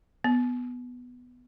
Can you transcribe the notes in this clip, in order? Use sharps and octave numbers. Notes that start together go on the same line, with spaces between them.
B3